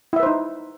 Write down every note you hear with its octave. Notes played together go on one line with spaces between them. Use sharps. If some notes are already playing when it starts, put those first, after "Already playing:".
D#4 E4 B4 C5 E5